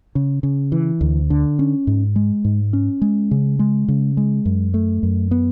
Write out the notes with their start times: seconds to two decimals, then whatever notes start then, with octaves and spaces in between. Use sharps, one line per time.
0.15 C#3
0.43 C#3
0.72 E3
1.01 D2
1.30 D3
1.59 C#4
1.87 G#2
2.16 G#3
2.45 G#2
2.73 C#4
3.02 G#3
3.31 C#3
3.59 G#3
3.88 C#3
4.17 G#3
4.45 F#2
4.74 A3
5.03 F#2
5.31 B3